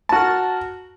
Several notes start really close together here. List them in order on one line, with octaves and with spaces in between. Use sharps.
A5 F#4 A#4